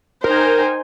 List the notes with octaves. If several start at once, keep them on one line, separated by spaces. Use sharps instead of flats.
D#4 A#4 C5 G5 G#5